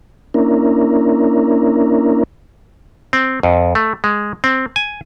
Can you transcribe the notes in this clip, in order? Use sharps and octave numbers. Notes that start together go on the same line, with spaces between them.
A#3 C#4 D4 E4 A#4
C4
F2
A3
G#3
C4
G#5